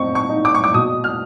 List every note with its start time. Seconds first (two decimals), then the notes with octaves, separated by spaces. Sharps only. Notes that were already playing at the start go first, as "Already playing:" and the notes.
Already playing: C4 D#4 C#6
0.15 C#6
0.29 D#4
0.45 D6
0.55 C#6
0.64 D6
0.74 B2 D#6
1.04 F6